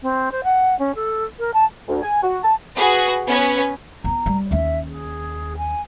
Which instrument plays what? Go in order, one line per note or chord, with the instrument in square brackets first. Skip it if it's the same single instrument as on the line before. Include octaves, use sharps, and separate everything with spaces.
[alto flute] C4
C5
F#5
C#4
A4
A#4
A5
[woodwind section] D2
G#5
F#4
A5
[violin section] F#4 G#4 B4
B3 C#4 B4 C#5
[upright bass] B3 E4 [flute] A#5
[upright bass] G3
[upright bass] D#2 C#4 [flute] E5
[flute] G#4
G#5